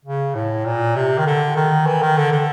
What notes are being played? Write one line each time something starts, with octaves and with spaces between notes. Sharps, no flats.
C#3
A2
A#2
C3
D#3
D3
D#3
E3
D#3
D3
D3